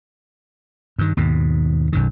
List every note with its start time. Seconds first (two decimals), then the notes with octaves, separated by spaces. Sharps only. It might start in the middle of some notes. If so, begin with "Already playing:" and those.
0.99 G2 D#3
1.17 D#2 G#2 B2
1.93 B1 F#2 D#3